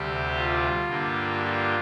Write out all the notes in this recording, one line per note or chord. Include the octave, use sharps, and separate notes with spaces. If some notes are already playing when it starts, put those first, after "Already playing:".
Already playing: D2 C3 G3 G4
F4
G2 D3 G3 A#3
F4